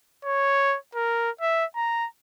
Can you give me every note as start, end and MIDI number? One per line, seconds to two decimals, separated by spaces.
0.25 0.76 73
0.95 1.31 70
1.41 1.65 76
1.76 2.07 82